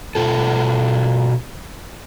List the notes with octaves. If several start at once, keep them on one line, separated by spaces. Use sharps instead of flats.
B2 F4 A4